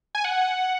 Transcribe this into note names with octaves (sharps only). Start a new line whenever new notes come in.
G#5
F#5